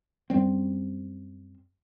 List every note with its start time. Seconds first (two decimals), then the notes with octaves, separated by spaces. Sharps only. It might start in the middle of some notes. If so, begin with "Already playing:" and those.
0.30 F#2 G3 C4